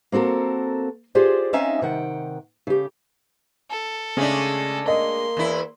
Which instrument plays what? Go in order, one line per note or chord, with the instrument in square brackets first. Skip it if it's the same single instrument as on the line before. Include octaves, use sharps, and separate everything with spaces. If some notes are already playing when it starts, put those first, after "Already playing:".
[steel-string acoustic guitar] A#3 C4 F#4 A4 A#4
F4 G4 G#4 C5 D5
C4 C#4 D#4 E5 F5 G#5
C3 D#3 F#5 G5
C#3 G4
[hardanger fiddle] A4
[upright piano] C#3 [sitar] G#3 A3 D4
[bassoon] A#3 [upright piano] D#5 [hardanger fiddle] C6
[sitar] E2 E4